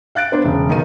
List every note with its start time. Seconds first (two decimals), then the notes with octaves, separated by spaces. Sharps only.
0.15 F5 F#6 A6 D7
0.32 B3 D4 C5
0.44 E1 C#3
0.69 B1 D#3 B3 D#7